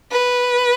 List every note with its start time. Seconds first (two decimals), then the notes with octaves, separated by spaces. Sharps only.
0.12 B4